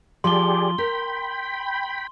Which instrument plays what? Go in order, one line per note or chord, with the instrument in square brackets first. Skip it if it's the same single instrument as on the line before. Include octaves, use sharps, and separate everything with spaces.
[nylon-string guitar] F3 [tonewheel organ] G4 G#4 D5 [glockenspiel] C6 G7
[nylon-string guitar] A#4 [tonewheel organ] G5 B5